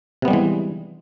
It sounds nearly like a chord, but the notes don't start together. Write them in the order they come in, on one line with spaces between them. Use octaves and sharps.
C3 B3 G3 G#3 E3